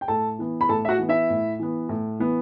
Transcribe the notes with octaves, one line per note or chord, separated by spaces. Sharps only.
G5
A2 A4 A5
E3 B3
B5
A2 A4 A5
E5
F#4 F#5
E3 B3
E4 E5
A2
E3 B3
A2
E3 B3